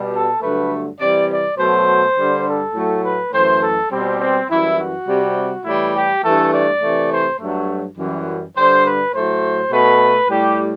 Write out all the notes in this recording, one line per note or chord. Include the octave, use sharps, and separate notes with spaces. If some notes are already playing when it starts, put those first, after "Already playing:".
Already playing: B2 G3
A4
G2 D3 F#3 A3 B4
C3 E3 G3 D5
D5
B2 F#3 A3 C5
G2 D3 G3
A4
A2 F#3 A3
B4
F#2 E3 A3 C5
A4
B2 G3 C4
C4
F#2 E3 G3 E4
F#4
C3 G3
A2 E3 G3 E4
G4
G2 E3 A3 A4
D5
C3 E3 A3
C5
G2 F#3 A3
F#2 E3 G3
G2 D3 G3 C5
B4
A2 F#3 A3 C5
B2 A3 B4
A2 G3 G4